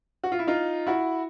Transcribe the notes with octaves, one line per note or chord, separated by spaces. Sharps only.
F#4
F4
E4
D#4 F4
E4 F#4